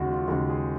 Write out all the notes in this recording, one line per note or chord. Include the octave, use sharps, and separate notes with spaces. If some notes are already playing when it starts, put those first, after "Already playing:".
Already playing: D#2 C#3 G#3 F#4
F4
D#2 C#3 G#3
G#4